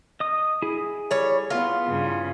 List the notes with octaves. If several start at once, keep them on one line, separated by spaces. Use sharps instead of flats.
D#5 D#6
E4 G#4
G3 C#5
B3 F4
G2 C#3